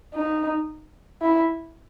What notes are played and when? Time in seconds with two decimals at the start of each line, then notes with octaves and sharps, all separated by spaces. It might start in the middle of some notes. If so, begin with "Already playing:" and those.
0.14 D#4
1.22 E4